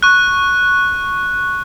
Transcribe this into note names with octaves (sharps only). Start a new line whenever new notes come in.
C#6 F#6